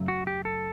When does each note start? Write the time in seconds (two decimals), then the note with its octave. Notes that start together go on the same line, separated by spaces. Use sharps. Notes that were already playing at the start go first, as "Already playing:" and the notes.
Already playing: F#2 C#3 F#3 A3
0.08 F#4
0.27 G4
0.45 A4